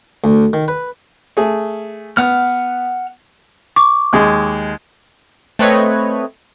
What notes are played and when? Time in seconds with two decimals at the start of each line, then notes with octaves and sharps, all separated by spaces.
0.24 D2
0.53 D#3
0.68 B4
1.37 A3 G#4
2.17 B3 F#5 F6
3.76 C#6 D6
4.13 D#2 G#3
5.59 A3 C4 B4 C#5 D#5